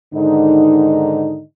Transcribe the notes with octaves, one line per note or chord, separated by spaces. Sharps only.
G#2 D3 D#3 D#4